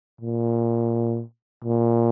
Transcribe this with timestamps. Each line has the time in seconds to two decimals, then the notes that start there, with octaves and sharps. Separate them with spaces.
0.21 A#2
1.65 A#2